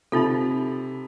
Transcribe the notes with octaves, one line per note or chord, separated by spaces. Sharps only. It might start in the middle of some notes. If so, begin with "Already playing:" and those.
C3 D#4 F4 A4 B5